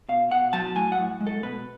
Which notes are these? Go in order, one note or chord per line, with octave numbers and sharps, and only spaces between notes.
B2 F5
B2 F#5
F#3 A5
A2 G#5
F#5
A2
G#3
A4
B2 B4